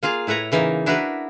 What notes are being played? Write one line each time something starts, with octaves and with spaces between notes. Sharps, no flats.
A#3 F4 G#4 F5
A2 E4 B4 C#5 A#5
C#3 E3 A#3 D#4
D4 E4 F#4 A#4 B4